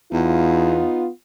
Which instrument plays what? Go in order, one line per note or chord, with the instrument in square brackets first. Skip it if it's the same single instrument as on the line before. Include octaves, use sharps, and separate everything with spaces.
[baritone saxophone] E2 [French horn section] B3 D#4 F4